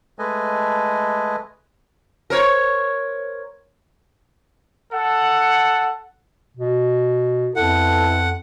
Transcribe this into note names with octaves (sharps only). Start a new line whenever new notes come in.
G#3 A3 A4 B4 D#5 G#5
A#4 C5 C#5
A4 F#5
B2
F2 B3 E4 A4 F#5